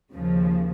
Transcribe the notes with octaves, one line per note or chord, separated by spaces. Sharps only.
D#2 C#3 F3